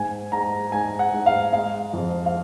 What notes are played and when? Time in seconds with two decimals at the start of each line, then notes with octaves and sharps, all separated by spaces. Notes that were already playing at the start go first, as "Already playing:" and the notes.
Already playing: G#2 G#5
0.32 G#2 A#5
0.72 G#2 G#5
0.99 F#5
1.13 G#2
1.26 F5
1.53 G#3 F5
1.93 F2
2.26 F5